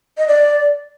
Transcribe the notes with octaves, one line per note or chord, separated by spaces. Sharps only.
D#5
D5